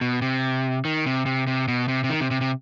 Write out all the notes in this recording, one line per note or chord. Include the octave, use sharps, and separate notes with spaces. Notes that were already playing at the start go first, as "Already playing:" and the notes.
B2
C3
D#3
C3
C3
C3
B2
C3
C3
D#3
C3
C3
C3